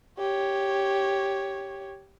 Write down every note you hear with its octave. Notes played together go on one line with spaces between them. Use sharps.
G4 C#5